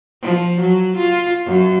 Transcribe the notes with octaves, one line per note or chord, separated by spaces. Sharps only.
F3
F#3
F4
F#2